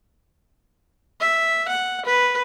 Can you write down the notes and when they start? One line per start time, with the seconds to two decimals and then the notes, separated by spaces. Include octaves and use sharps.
1.20 E5
1.68 F#5
2.06 B4